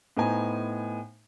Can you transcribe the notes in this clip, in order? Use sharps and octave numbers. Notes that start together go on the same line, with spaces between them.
A2 B3 D#4 C5 G#5 A#5